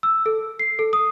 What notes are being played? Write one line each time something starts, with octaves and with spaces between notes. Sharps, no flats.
E6
A4
C7
A4
D#6